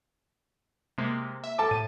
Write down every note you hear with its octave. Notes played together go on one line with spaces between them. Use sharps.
C3 G#3 A#3
E5
A4 A5 D6
A2 D#7